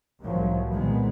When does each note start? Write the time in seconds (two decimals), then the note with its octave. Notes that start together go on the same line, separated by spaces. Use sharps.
0.20 C2 A2 D#3 F3 F#3
0.69 A#2 D#3 G#3 B3 C4